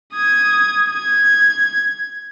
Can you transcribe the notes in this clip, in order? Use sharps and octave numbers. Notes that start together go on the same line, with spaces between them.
D#6 G#6
G#6